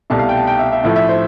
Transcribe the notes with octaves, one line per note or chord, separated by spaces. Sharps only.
C2 B2 A3 A5
F5
G5
A5
G5
E5
E5
A2 F3 A3 E5
E5
C5